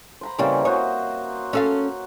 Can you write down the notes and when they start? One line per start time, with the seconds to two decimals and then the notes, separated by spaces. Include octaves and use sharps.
0.21 C5 A#5 B5
0.39 C#3 E3 G3 A#3 C4 C#4
0.65 F#4 C5 C#5 D#5
1.53 C#4 A4 F5